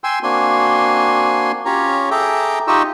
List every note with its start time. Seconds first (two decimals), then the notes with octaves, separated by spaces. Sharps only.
0.04 G5 G#5 C6 E6
0.23 A#3 C4 D4 F#4 G#5 C6
1.65 C#4 F4 G4 C#5 A#5
2.11 G#4 A4 E5 G5 A#5 D6
2.68 D#4 F4 G4 D#5 C#6 E6